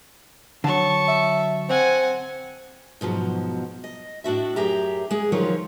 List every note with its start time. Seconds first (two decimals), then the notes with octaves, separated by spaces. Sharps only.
0.64 D3 F#3 A5 C#6
1.08 E5
1.69 C4 F#5 G#5
3.01 G#2 B2 F3 F#3
3.84 D#5
4.24 A2 D4 F#4 E5
4.56 F#2 G4 G#4 E5 A#5
5.11 G#3 G#4
5.32 D3 D#3 F3 F#3 F4 C#5